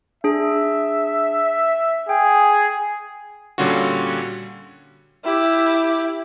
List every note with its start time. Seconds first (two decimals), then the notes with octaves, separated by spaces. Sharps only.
0.24 D4 G#4 E5
2.09 G#4 G5
3.58 A#2 D3 G3 C#4 F4 F#4
5.24 E4 G4